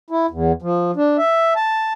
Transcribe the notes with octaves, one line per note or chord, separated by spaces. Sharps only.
E4
E2
F3
D4
E5
A5